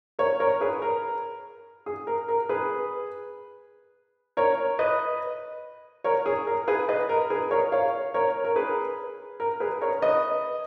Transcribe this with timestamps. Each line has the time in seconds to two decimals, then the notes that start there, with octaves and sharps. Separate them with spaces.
0.19 A#4 C#5
0.40 A#4 C#5
0.61 G#4 B4
0.82 A#4
1.86 G#4
2.07 A#4
2.28 A#4
2.49 G#4 B4
4.37 A#4 C#5
4.79 B4 D#5
6.04 A#4 C#5
6.26 G#4
6.47 A#4
6.68 G#4 B4
6.89 B4 D#5
7.09 A#4
7.30 G#4 B4
7.51 A#4 C#5
7.72 C#5 F5
8.14 A#4 C#5
8.45 A#4
8.56 G#4 B4
9.40 A#4
9.60 G#4 B4
9.81 A#4 C#5
10.02 B4 D#5